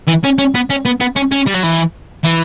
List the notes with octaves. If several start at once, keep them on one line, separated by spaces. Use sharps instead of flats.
E3
C#4
C#4
B3
C#4
B3
B3
C#4
C#4
G3
F#3
E3
E3